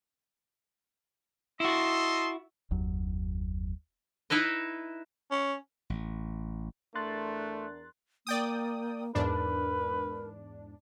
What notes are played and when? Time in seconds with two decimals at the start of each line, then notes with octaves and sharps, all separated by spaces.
1.60 E4 F#4 A4 D#5 C6
2.71 F#1 D#2 F#3
4.30 D#4 E4 B4 D#5
5.31 C#4
5.90 A1
6.95 E2 A3 D4 A#4 C6 F#6 A6
8.27 A#3 D5 G5 D#6
9.15 E2 G#2 D4 A#4 B4